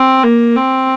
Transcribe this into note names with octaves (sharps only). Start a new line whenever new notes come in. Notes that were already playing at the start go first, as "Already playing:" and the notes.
Already playing: C4
A#3
C4